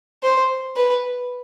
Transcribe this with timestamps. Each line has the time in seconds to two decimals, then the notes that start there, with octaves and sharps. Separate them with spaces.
0.23 C5
0.77 B4